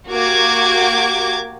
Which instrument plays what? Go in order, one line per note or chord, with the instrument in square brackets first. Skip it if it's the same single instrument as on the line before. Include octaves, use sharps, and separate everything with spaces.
[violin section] A#3 F#4 G4 D6 G#6